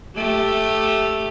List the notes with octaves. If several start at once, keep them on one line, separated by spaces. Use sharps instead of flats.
A3 G4